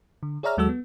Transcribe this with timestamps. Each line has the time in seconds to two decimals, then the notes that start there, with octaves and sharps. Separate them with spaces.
0.23 D3
0.43 G#4 C#5 D5 E5 A#5 F6
0.57 D#2 F#3 G#3 F#4 A4 E6
0.69 B3